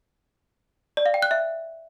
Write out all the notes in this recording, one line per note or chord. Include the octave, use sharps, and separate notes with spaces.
D5
F5
G5
F#6
E5